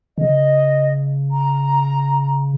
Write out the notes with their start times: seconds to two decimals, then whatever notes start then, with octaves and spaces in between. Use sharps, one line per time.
0.18 C#3 D#5
1.31 A#5